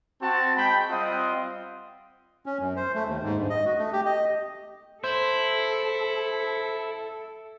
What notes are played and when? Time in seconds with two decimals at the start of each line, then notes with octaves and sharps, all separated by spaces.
0.22 C4 F#4 A5
0.56 G#3 G5 B5
0.89 G3 C4 F4 D#5 F#5 D#6
2.46 C#4
2.60 F#2
2.77 C5
2.95 A3
3.08 D#2
3.23 G#2
3.37 G2
3.50 D#5
3.65 F#4
3.78 A3
3.93 G4
4.05 D#5
5.04 E4 A4 C5